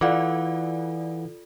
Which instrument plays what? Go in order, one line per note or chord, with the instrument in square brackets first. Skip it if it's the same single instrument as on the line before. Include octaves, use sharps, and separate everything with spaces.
[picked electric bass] E3 [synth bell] F4 A4 D5 [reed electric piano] F5 F#5 D6